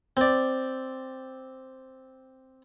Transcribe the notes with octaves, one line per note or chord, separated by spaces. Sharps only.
C4 D5